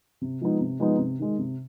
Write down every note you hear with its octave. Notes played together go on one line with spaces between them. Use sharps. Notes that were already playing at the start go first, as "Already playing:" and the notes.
C3
F3 G#3 B3 D#4
C3
F3 G#3 B3 D#4
C3
D#3 G#3
C3